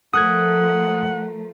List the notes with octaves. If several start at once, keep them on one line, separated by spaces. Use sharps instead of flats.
F3 A3 A4 A#4 F#5 D#6 F#6 G#6